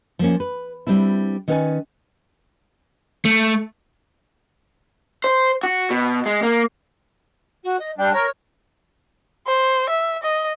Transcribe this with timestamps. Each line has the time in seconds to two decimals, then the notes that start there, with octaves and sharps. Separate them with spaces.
0.19 F3 A#3 C#4
0.40 B4
0.87 G3 C4 D4 E4
1.48 D#3 C#4 B4 C#5 D5 G#5
3.25 A3
5.24 C5
5.63 F#4
5.91 B2
6.26 G#3
6.43 A#3
7.63 F#4
7.79 D#5
7.98 G3 D4 G5
8.13 A#4 C#5
9.47 C5
9.89 E5
10.23 D#5